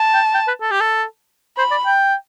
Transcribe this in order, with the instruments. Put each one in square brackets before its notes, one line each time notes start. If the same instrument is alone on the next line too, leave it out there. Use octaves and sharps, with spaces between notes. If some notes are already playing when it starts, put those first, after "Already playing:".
Already playing: [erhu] A5
[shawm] G5
G5
B4
A4
G4
A4
[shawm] C5 [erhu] B5
[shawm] D5
G5